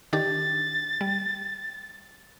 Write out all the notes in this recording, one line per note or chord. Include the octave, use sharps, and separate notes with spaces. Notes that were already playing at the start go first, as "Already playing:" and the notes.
D#3 D4 G4 A6
G3